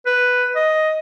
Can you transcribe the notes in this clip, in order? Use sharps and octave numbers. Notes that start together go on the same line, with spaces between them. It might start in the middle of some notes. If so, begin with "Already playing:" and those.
B4
D#5